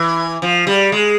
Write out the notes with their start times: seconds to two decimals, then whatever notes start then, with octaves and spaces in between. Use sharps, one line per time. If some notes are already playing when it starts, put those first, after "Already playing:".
Already playing: E3
0.42 F3
0.67 G3
0.92 G#3